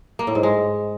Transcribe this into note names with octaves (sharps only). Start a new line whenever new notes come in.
A#3
A2
G#2
G#3